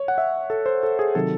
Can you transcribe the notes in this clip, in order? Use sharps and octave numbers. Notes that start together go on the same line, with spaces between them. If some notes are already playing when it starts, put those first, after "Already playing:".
Already playing: C#5
F#5
E5
A4
C5
A4
G#4
C3 D#3 F#3 A4